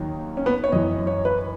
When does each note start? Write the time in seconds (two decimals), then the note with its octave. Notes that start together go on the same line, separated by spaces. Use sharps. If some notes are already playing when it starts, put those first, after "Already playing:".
Already playing: D#2 D#3 F#3
0.37 C#4
0.46 B3
0.64 C#5
0.72 F#2 E3 D#5
1.07 C#5
1.25 B4